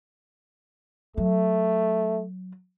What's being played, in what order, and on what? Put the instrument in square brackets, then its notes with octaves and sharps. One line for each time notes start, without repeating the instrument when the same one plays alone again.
[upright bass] F#3 [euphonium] A3